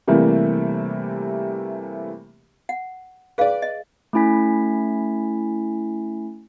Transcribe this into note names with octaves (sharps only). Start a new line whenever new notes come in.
C3 E3 G3 A3 A#3 G4
F#5
G#4 B4 D5 F5
D#5
A3 C#4 E4 G#5 B6